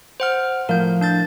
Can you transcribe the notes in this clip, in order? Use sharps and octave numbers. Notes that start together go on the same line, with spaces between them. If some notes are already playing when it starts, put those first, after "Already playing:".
C5 F#5 F6
A2 F3 A#4 F5 G6
D4 G6 A6